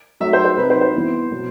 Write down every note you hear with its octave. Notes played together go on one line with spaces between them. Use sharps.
F#3 A3 D#4 E5
C5
C5
C3 F#3 C4 D#4 B4
C5
C5
E3 B3 E4
B2 F#3 B3